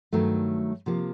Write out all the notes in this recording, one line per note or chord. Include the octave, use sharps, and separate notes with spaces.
G2 D#3 F#3 A3
C3 F3 A#3